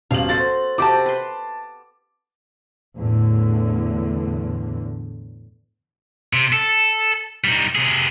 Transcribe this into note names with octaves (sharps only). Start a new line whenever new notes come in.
D#1 B2 F5 F#7
F#4 A4 C5 A6
C3 F#4 G4 A5 D6
B4 C6
E2 A2 D3
C3
A4
G3 D#4
C3 G#4